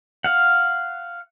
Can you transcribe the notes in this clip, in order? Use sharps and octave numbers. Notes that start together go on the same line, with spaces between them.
F5 F#5